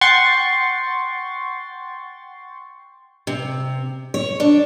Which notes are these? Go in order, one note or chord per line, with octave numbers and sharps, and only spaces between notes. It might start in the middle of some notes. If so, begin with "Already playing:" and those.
F#5 G5 C6 C#6 A6
C3
C#5
D4